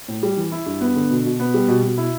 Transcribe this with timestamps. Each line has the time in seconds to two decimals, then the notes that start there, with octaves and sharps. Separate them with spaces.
0.08 A2
0.23 G3
0.37 E3
0.52 E4
0.66 G2
0.81 B3
0.96 D3
1.10 B2
1.25 B2
1.40 B3
1.54 G3
1.68 B2
1.83 B2
1.98 E4